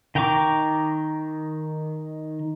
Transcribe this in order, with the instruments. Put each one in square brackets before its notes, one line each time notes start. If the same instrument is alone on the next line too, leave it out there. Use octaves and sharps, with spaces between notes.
[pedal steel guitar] D#3 G5 A#5 C#6 D6